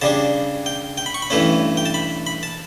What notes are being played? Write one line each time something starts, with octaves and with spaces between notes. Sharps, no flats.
C#3 G3 D4 A5
G5
G5
B5
C#6
B5
G2 E3 A3 C#4
G5
A5
B5
B5
A5